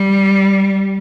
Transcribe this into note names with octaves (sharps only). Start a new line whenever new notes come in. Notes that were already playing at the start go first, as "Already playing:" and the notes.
Already playing: G3